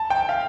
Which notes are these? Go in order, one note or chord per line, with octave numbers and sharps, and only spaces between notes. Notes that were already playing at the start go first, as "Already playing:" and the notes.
Already playing: A5
G5
F5